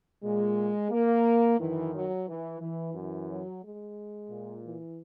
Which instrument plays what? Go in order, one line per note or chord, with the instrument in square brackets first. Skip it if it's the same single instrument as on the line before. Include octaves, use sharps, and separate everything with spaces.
[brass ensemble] A#2 G#3
A#3
F#2 D#3 E3
F#3
E3
E3
F#2 E3
F#3
G#3
A#2
E3